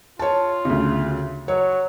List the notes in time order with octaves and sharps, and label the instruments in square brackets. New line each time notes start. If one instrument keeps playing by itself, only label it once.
[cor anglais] F4 [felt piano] C#5 A5
[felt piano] D2 C#3
[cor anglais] F#3 [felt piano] C#5